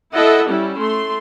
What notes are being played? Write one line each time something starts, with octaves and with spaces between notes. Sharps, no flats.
E4 A4 D#5 E5 F#5
G3 C#4 E4
A3 C6